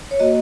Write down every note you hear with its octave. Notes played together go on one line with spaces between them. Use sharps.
C#5
A#3 F#4 D#5